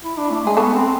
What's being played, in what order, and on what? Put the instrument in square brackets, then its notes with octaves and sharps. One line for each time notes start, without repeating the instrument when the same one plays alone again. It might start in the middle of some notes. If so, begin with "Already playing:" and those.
[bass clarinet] E4
D4
A3
[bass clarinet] G#3 [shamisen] G#4
[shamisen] A3 A4 [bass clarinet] B3
[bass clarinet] C4